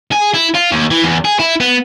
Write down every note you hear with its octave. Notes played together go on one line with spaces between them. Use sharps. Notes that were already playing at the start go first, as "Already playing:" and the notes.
G#4
E4
F4
D#2
E3
E2
G#4
E4
B3